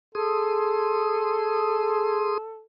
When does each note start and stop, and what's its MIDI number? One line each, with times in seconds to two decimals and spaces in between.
0.15 2.38 68
0.15 2.63 69
0.15 2.38 84
0.15 2.38 87